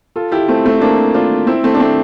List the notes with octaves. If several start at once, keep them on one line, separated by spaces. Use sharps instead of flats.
F4 A4
E4 G4
A3 C4
A3 C4
A#3 D4
D4 F4
C4 E4
A3 C4
D4
A3 C4